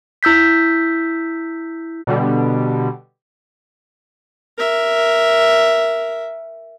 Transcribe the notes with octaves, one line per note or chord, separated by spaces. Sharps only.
E4 E6 G6 B6
B2 D3 G3
A#4 E5